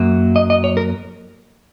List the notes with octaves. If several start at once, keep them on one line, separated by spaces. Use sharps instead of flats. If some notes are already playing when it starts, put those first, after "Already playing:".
Already playing: F#2 F#3 A#3
D#5
D#5
C#5
A#4